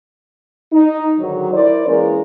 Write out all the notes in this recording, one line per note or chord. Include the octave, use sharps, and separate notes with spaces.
D#4
G#2 D3 D#3 F#3
E4 A#4 C5 D5
E3 G#3 A#3 C#4 A#4